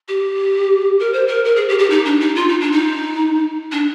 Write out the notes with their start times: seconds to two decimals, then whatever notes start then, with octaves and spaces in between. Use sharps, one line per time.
0.08 G4
1.00 A#4
1.13 C5
1.28 A#4
1.45 A#4
1.56 G#4
1.69 G4
1.79 G4
1.90 D#4
2.05 D4
2.20 D#4
2.35 F4
2.48 D#4
2.60 D4
2.72 D#4
3.72 D4